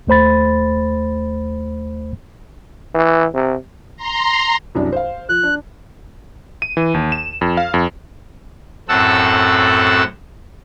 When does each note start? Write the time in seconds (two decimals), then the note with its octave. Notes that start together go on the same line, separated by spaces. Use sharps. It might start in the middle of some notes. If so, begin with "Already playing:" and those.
0.07 D#2 A3 C5 B5 A6
2.95 E3
3.34 C3
3.97 A#5 C6
4.75 C2 F#2 D4
4.92 C5 F5
5.29 F3 F#6
5.43 D4
6.62 D#7
6.77 E3
6.94 D#2
7.12 E7
7.41 F2
7.57 F5
7.74 F2
8.89 F#2 A2 C4 A4 F#5 E6